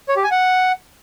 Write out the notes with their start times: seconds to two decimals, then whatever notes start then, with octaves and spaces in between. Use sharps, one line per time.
0.09 C#5
0.16 G4
0.24 G#5
0.31 F#5